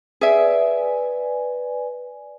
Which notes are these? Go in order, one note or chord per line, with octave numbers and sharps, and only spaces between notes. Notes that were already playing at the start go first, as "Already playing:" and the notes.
G#4 B4 D5 E5 G#5